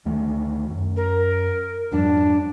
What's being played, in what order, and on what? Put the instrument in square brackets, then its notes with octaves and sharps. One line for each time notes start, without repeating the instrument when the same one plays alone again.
[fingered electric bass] D2 D#3 A3
F#2
[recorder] A#4
[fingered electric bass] F2 G#2 F#3 [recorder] D4